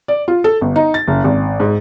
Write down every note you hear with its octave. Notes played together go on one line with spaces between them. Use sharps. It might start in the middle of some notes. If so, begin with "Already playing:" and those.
D5
F4
A4
G1
D#4
A6
F#1
G#1
G#2